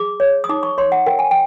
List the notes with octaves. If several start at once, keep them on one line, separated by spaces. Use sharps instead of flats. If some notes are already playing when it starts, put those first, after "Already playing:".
Already playing: G#4 D6
C#5
D#6
D#4 D6
C#6
C#5 C6
F#5
A#4 G5
G#5
G5